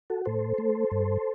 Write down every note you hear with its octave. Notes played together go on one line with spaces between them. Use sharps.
F#4 A4
A2 A4 C5
A3
G2